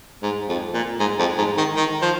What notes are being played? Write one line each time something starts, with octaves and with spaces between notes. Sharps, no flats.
G#2
F2
A#2
G#2
F2
G#2
D#3
D#3
F3